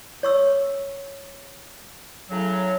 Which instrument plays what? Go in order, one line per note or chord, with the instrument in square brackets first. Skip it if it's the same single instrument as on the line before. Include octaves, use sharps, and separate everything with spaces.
[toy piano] C#5 C#6 E6
[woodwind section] A2 C#3 F#3